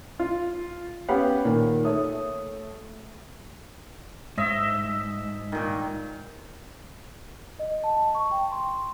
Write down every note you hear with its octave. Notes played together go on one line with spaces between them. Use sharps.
F4
B3 C#4 G4 B4 F5 F#5
A#2 D#3
A3 C#5 D#6
G#2 D#5 E5
A#2 D#3
D#5
A5
C#6
G5
C6